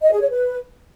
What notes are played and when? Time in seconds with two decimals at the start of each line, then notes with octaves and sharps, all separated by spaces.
0.02 D#5
0.11 G#4
0.21 C#5
0.30 B4